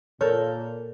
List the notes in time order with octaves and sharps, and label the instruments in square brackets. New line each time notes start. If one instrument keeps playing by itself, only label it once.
[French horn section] A#2 [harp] A4 A#4 G6 [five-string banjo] C#5